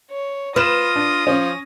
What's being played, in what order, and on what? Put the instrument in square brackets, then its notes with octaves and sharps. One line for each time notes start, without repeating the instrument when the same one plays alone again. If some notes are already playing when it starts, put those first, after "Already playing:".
[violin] C#5
[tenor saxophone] F4 [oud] B4 [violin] D#6 A#6 [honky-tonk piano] F6 E7
[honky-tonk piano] D4
[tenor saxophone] F3 [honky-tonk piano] C#4